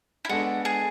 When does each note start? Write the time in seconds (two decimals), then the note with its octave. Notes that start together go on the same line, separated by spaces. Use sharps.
0.25 E4
0.29 G#3 B3 D4 F#4 A4
0.65 G#4